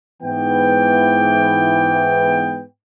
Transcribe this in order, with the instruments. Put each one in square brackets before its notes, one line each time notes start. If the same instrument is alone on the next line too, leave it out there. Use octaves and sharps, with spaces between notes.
[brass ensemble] G#2 E3 B3 G5